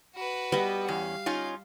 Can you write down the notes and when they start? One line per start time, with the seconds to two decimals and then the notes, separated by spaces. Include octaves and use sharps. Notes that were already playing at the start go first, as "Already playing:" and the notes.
0.15 F#4 B4
0.52 G3 B3 D#5
0.88 E2 C#4 F5
1.26 C#4 D#4 F4